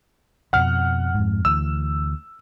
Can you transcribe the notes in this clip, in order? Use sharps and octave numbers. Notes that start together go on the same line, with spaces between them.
F2 B2 F3 F#5 F6
F2 G#2
D2 E3 E6